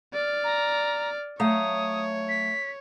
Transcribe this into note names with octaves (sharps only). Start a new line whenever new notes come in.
D5 F6
A#5
F#3 A3 C#5 F5 D#6
B6